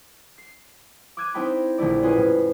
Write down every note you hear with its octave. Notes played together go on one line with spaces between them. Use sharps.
C7
D6 E6 F#6 G#6 D#7 E7
C4 D#4 E4 G5 A5 B5
A#1 D3 A3 E4 D5
A#3 C#4 E4 F4 G#4 B4
F2 A2